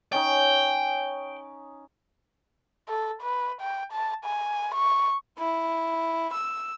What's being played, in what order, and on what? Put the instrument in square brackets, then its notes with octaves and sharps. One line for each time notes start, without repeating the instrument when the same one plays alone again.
[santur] C#4 D#4 [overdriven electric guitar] G5
[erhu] A4
B4
G5
A5
G#5
C#6
[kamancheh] E4
E6